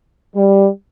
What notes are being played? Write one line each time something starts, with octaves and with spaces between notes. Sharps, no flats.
G3